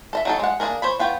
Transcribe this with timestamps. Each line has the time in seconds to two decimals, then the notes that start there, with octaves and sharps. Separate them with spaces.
0.13 A4 D#5 E5
0.25 F#3 D#4 A4
0.40 G#3 F#5
0.60 A#3 C#4 D4 G#4 A#4
0.82 C5 C#5 B5
1.00 B3 F4 C#5 G5